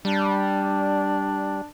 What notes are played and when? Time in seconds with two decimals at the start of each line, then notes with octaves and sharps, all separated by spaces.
0.05 G3 D4